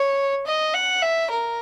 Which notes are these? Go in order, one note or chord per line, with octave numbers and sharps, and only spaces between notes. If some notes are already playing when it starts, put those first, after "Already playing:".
Already playing: C#5
D#5
F#5
E5
A#4